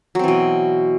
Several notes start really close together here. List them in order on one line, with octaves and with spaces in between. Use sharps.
F#3 C4 E3 B2